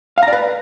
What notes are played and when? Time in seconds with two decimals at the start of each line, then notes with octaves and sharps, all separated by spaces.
0.18 F5
0.23 A#5
0.28 D5
0.33 B4